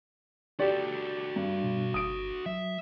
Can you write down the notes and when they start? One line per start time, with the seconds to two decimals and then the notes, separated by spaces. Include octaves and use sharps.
0.60 F#4 G4 A4 D5
1.36 G2
1.64 B2
1.94 G1 D#6 D7
2.46 F#3 E5